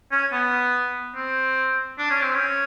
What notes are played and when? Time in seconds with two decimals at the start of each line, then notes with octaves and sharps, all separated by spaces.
0.12 C#4
0.32 B3
1.15 C4
1.98 D4
2.10 C#4
2.22 C4
2.34 C#4